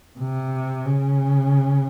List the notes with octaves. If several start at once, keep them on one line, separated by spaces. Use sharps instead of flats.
C3
C#3